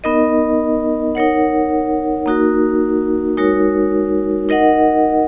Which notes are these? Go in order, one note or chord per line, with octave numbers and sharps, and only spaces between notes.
B3 D#4 A#4 D#5
D#4 A#4 C#5 F#5
A#3 D#4 F#4 A#4
G#3 D#4 F#4 A#4 C#5
D#4 A#4 D#5 F#5